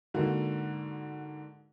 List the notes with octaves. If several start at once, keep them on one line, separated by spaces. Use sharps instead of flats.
G#2 D3 A#3 F#4